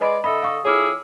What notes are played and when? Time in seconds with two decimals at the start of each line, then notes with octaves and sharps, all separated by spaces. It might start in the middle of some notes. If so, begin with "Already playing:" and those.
0.01 G#3 B4 D5 D#5 B5
0.24 D3 A4 D#5 E5 B5
0.42 F5 C#6 D#6
0.65 F2 E4 G#4 C#5 D6 F6